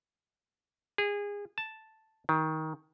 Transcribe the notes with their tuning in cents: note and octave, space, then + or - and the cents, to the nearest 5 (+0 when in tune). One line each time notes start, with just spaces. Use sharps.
G#4 -25
A5 +0
D#3 +20